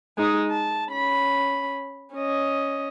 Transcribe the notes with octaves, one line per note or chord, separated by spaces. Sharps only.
G#3 D#4
A5
C#4 B5
C#4 D#5